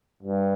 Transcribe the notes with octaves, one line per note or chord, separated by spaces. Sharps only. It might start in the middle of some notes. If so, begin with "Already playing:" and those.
G2